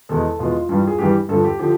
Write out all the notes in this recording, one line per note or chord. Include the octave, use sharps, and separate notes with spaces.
E2 B2 G#3 A4
E2 B2 G#3 F4
G2 E3 G3
G#4
G2 E3 G3 G4
G2 D3 F3 A4
G4
D3 F3 G4